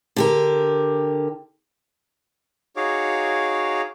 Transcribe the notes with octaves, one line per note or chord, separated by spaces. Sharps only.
D3 G4 A#4
D#4 F#4 G#4 C#5 F5 D6